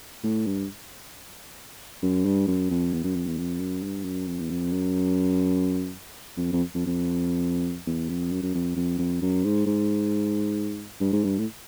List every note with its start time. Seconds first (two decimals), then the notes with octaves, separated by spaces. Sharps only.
0.24 A2
0.46 G2
2.03 F#2
2.25 G2
2.48 F#2
2.70 F2
2.93 E2
3.04 F#2
3.15 F2
3.26 E2
3.38 F2
3.60 F#2
3.83 G2
4.05 F#2
4.28 F2
4.39 E2
4.50 F2
4.73 F#2
6.37 F2
6.52 F2
6.75 F2
6.86 F2
7.87 E2
8.09 F2
8.32 F#2
8.43 F#2
8.55 F2
8.76 F2
8.99 F2
9.22 F#2
9.45 G#2
9.66 G#2
11.01 G2
11.13 G#2
11.24 G2
11.38 A2